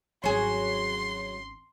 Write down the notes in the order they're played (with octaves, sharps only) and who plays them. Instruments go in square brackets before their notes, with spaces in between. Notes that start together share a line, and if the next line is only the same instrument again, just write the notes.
[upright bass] G#1 C#4 [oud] F#3 G#4 [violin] C6